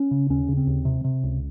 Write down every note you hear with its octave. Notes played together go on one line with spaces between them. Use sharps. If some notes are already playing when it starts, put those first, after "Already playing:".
Already playing: C#4
C#3
D#2 C#4
C#3
C4
D#2
C3
C3
C#2